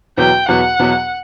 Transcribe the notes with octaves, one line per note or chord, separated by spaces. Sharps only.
E2 B2 F#3 B3 F#4 G5
E2 B2 F#3 B3 F#4 F#5
E2 B2 F#3 B3 F#4